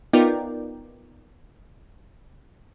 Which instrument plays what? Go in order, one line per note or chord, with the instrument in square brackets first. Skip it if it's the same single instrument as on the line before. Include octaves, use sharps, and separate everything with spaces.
[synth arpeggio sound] B3 D#4 F4 A#4 D5 G5